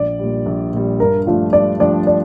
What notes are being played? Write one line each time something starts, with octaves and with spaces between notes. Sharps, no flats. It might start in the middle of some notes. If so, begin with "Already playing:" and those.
Already playing: A#1 D5
A#2 G3
A#1
A#2 G3
G2 A#4
F3 A3 D4 F4 G4
G2 D5
F3 A3 D4 G4 D5
D5